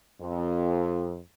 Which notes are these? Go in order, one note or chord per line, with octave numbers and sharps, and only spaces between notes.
F2